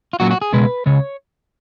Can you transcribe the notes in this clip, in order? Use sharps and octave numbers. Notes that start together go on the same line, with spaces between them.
F4
A#2 F#3 C#4 F#4
F#4
G#4
C#2 B2 G#3 B4
C#2 C#3 C#5